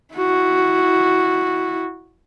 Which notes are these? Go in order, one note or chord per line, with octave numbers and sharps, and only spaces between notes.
E4 F#4